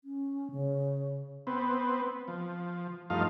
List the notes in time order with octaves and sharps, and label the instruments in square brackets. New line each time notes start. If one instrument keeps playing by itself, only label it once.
[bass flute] C#4
C#3
[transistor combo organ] B3 C4
F3
G2 F3 A3 D#4 F4 F5